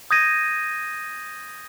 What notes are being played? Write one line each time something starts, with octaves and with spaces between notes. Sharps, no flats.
D#6 G6 G#6 A#6 D#7